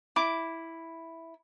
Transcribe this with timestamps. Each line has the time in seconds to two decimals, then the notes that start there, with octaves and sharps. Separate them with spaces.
0.16 E4 D6